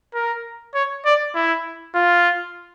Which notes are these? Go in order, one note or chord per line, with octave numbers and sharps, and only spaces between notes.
A#4
C#5
D5
E4
F4